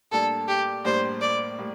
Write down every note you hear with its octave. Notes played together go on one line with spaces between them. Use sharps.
A2 G3 A#3 D4 A4
G4
A2 G3 A#3 D4 C5
D5
A2 G3 A#3